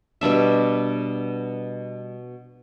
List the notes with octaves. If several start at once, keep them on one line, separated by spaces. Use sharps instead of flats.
B2 G3 D4 E5